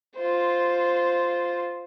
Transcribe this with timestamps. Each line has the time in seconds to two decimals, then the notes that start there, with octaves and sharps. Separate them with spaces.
0.17 F4 C5